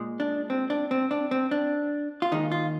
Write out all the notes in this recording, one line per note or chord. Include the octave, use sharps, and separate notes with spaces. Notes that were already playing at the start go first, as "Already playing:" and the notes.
Already playing: A#2 G#3
D4
C4
D4
C4
D4
C4
D4
F4
D#2 D#3 G#3 D#4
F4